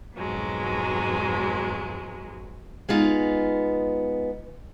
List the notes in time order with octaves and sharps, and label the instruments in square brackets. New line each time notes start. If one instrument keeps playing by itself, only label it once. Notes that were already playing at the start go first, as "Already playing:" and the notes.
[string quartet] F2 G#2 B2 F#3 G#3
[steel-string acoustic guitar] G#3 B3 D#4 F4